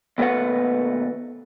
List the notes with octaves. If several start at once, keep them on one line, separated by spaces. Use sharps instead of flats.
D#2 B2 A3 C4 B4 F#5